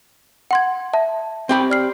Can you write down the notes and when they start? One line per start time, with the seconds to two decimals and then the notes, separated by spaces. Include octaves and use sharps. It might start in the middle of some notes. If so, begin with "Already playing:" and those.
0.51 F#5 C6 G#6
0.93 E5 A5
1.49 C4 G4 B5
1.70 D5 F6 C7